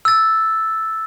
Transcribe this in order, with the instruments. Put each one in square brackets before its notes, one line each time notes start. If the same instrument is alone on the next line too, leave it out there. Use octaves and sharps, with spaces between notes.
[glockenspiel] E6 A6